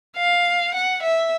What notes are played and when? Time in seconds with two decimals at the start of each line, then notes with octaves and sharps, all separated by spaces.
0.17 F5
0.75 F#5
1.03 E5